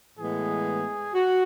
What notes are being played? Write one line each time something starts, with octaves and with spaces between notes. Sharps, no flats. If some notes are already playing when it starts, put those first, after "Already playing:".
A2 E3 G#3 B3 G#4
F#4